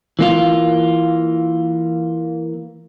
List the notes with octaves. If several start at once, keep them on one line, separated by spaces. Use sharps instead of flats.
E3 A#3 F4